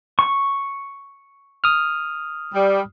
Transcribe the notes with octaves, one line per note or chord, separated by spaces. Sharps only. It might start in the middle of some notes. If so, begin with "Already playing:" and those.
C#6
D#6 F6
G3